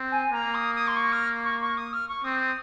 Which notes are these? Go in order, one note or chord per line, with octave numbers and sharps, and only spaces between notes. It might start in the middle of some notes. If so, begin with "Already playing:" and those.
Already playing: C4
G#5
A#3 A#5
D#6
D#6
C6
C#6
F6
C#6
C#6
D#6
F6
C#6
C4 D#6
D#6